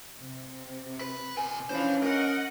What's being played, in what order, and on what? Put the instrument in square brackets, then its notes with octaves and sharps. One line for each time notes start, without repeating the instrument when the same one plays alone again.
[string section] C3
[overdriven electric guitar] B4
B2 G#5
[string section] E3 D4 [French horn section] C#4 [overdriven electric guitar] C5 F5
[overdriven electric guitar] A#4 [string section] D#5 F#5